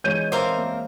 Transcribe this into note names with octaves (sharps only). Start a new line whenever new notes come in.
E3 G#3 C#5 G6 D#7
C4 A#4 C5 E5 F5 D6
A#3